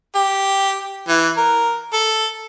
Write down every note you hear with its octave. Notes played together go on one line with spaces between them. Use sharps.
G4
E3
A#4
A4